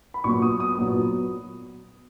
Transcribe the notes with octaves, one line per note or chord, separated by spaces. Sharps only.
B5
A#2 F#3 B3 C#6
D#6
D#6
A#2 F#3 B3